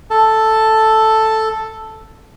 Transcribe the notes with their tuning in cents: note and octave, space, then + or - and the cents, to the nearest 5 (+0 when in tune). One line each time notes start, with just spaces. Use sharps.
A4 +0 A5 +0